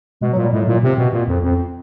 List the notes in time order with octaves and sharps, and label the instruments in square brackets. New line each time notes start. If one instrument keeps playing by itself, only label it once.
[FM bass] B2 [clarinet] G#3
[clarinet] F#3
[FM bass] A#2
[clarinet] G3
[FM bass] A2 [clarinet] G#3
[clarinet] F#3
[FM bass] A#2
[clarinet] F#3
[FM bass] C3 [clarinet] C4
[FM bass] B2
A#2
F2
[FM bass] F2 [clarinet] C4